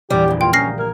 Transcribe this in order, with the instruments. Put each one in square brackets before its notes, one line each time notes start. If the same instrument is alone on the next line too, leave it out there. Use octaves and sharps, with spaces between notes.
[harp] A#1 E2 [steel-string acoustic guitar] G3 [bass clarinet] G4
[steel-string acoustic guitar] D2 G2
[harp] A#3 F5 [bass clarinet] F4 [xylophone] G5
[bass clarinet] C#4 [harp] A#5 D#6 G6 [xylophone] F6 A#6 C7
[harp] A#3 G#6 [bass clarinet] A#4